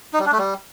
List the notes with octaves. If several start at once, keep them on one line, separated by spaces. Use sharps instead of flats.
D#4
G3
D4
A3
G3